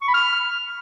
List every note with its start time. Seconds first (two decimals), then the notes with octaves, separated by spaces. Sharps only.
0.01 C#6
0.08 B5
0.14 F6